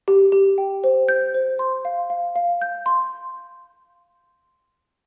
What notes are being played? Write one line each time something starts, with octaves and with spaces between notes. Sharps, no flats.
G4
G4
G5
C5
G6
C5
C6
F5
F5
F5
G6
C6